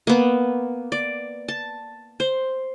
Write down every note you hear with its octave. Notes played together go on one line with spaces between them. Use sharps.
A#3 B3
D5
A5
C5